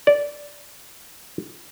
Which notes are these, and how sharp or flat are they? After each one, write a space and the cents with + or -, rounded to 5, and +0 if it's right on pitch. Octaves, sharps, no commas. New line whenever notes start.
D5 -10